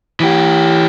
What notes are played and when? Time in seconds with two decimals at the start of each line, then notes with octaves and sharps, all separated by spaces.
0.20 E3 G4